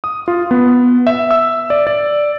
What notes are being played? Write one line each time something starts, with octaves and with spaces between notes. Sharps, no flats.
D#6
F4
B3
E5
E6
D5
D5